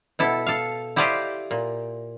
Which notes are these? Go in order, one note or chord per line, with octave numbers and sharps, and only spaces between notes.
B2 E4 A4
A4 F5
E4 G4 C5 D5 D#5 F5
A#2